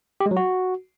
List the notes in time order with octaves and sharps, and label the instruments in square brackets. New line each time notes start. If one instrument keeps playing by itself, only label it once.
[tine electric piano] G4
G#3
F#3
F#4